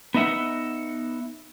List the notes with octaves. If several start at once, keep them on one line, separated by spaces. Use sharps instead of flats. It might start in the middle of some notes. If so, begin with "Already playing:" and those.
B3 D#4 E5 F#5